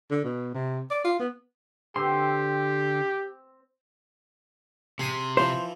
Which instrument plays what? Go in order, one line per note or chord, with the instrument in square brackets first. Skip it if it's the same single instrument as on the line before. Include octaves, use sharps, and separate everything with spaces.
[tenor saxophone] D3
B2
C3
D5
F4
B3
[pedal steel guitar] D3 C6 [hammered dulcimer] C4 [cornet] G4
[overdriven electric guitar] C3 [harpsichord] G#4 C6 D#6
[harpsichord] E3 F3 [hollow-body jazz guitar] C5